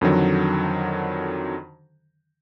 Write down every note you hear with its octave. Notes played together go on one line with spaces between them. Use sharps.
F2 D3 D#3 F#3